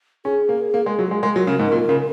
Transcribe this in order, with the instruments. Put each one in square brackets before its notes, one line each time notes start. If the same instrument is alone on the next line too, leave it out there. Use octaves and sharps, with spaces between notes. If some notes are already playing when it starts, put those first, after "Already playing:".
[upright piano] C#4 [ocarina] G#4
[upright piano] A#3
A#3
G#3
F#3
G#3
[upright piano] G#3 [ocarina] A#4
[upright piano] F#3
C#3
G#2
A#2
C#3